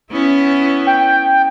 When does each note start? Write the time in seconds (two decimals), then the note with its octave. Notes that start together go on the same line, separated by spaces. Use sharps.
0.11 B3 C#4 E4
0.87 G5